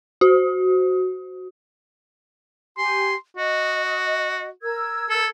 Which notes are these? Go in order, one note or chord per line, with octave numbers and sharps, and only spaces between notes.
F#4
G4 G#5 C6
F#4 D#5
A#4 E6 G#6
A4